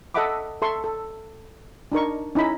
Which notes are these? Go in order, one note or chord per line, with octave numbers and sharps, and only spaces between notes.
A4 D#5 E5 F#5 B5 D6
A4 E5 C6 C#6
A4
D4 D#4 A#4 C#6
C#4 D#4 E4 B5